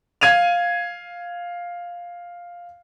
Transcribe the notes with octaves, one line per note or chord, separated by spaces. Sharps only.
F5 G#6 D#7 F7